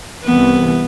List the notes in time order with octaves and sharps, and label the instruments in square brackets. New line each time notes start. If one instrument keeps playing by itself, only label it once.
[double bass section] C2 C3 E3 [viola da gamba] B3